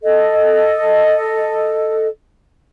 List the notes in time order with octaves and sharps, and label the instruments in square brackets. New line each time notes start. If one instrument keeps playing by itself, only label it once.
[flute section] A4 D#5